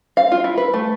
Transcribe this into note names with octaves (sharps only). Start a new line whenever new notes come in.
F5
F4
E4
B4
A3